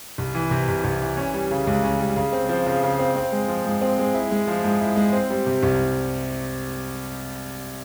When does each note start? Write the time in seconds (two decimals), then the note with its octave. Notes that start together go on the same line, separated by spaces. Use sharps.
0.18 C2
0.35 E3
0.51 C3
0.69 C2
0.84 C2
1.02 E3
1.17 C#4
1.34 G3
1.51 C#3
1.67 C#2
1.84 C#4
1.99 G3
2.16 C#3
2.32 C4
2.49 F3
2.66 C#3
2.83 C#3
2.99 C4
3.16 C4
3.32 G#3
3.48 F3
3.66 G#2
3.82 C4
3.99 G#3
4.14 E4
4.31 G#3
4.48 F3
4.64 G#2
4.81 E4
4.96 G#3
5.13 C4
5.30 G3
5.46 C3
5.63 C2